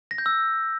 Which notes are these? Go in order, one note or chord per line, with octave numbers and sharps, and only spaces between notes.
A#6
G6
E6